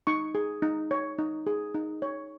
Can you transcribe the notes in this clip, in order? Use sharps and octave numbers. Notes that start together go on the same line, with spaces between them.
D#4 C#6
G#4
D#4
C#5
D#4
G#4
D#4
C#5